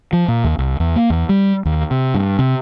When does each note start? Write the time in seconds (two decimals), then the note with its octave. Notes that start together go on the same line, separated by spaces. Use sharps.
0.13 F3
0.28 A#2
0.44 D#2
0.58 C2
0.80 E2
0.96 A#3
1.10 E2
1.29 G3
1.65 D#2
1.91 C3
2.14 G2
2.39 C3